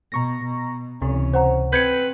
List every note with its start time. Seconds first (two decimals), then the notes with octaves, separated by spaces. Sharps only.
0.12 B2 A#5 C#6 A#6
0.44 B2
1.02 C#2 C3 E3 C#4
1.34 C5 F#5 A#5
1.73 C4 B4 G6 G#6 C#7